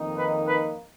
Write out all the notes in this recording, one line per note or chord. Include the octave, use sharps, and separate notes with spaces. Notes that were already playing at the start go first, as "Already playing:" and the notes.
Already playing: F2 D#3 A#3 D#4
B4
B4